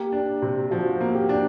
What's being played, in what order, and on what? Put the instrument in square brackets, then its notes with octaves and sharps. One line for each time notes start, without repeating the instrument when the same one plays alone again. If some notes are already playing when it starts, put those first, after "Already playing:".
Already playing: [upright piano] A#3 [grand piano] G4
[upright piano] D4
C3
[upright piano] F3 [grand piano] F#4
[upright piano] A#3
[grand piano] G4
[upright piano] D4